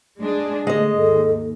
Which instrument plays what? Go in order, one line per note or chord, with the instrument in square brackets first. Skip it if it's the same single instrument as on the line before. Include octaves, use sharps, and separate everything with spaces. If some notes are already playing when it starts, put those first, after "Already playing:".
[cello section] G#3 D4 G#4
[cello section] D3 A3 [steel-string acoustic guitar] G#3 D#5
[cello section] D#2 G#2 [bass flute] A4